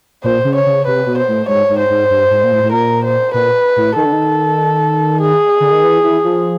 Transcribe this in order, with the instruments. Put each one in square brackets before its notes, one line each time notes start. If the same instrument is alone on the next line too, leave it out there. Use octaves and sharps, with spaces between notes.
[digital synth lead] A#2 [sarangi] C5
[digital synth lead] C#3
[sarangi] C#5
[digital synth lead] C#3
[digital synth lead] C3 [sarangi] B4
[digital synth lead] B2
[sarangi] C5
[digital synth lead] A2
[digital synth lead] G#2 [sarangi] C#5
[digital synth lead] G#2
[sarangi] C5
[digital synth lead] G#2
G2
G#2
A#2
A2
A2
[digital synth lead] A#2 [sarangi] A#4
[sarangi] C5
[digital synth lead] A#2 [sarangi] B4
[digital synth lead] A2
[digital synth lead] D#3 [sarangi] A4
[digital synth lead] D3
D#3
[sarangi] G#4
[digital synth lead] D3
D#3
E3
E3
F3